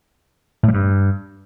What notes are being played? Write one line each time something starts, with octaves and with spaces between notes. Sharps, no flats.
A2
G3
G2